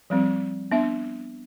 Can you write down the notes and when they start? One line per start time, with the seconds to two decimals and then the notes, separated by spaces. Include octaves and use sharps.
0.10 F3 G3 C4
0.72 B3 D4 E5